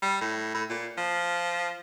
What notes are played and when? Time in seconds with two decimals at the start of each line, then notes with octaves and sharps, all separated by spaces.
0.02 G3
0.21 A2
0.54 A2
0.70 A#2
0.98 F3